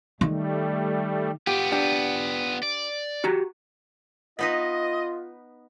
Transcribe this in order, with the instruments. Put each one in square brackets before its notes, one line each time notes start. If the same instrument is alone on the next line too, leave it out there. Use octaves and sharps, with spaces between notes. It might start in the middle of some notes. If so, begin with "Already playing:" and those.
[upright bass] D#3 [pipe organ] G3 A3
[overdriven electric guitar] B3 F4 [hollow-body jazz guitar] G4
[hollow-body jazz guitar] D4 G4
[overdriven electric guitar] D5
[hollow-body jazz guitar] F#4 G4 A#5
[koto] B3 D#4 B4 [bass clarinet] F4 [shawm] D#5